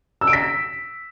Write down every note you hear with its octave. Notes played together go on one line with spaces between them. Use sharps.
E6
D7
B6